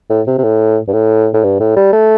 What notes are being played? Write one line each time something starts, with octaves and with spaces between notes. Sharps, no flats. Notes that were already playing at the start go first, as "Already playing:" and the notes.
A2
C3
C3
A2
G2
A2
A2
G2
A2
G3
A3